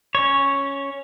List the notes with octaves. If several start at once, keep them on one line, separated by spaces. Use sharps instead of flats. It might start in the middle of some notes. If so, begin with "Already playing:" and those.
C#4 C#5